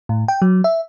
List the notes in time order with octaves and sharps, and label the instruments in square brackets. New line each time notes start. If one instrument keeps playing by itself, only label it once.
[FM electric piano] A2
G5
F#3
E5